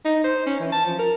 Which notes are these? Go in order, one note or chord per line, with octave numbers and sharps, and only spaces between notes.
D#4
C5
C#4
E3
A5
F3
A#4